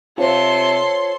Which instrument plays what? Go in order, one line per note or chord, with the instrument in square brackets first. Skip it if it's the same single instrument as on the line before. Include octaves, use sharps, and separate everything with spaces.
[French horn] C3 [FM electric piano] F4 C5 [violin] A4 C6 [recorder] C#5